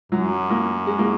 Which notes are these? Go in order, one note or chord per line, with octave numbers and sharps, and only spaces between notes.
F#2 F#3
A#3
G#3
A#3